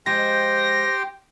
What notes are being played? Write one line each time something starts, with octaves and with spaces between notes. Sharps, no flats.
F3 G#3 G4 G5 C6 A#6